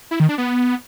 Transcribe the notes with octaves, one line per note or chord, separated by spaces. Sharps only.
E4
D#3
D4
B3